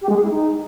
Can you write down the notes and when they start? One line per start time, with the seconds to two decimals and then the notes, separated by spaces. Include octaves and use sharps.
0.02 G4
0.09 G#3
0.16 G#4
0.23 E4
0.30 D#4